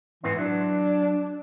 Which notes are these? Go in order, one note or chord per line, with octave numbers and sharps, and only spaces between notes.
G#2 E3 B3 C4
F#3 D4